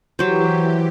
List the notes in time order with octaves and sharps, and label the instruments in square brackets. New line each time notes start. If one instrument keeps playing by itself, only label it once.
[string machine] E3 G4 [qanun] F#3 C5